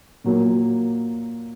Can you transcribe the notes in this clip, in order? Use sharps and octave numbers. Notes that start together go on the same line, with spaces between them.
A#2 F#3 A#3